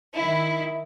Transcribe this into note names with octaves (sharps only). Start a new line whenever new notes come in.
D#3 E4